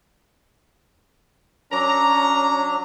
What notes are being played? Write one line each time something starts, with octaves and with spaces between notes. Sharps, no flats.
F#3 C#4 D4 A#5